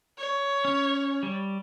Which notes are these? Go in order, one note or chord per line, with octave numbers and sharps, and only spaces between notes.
C#5
C#4
G3